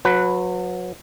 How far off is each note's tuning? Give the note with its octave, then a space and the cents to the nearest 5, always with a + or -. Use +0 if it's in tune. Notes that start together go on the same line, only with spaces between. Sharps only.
F#3 -25 B4 +0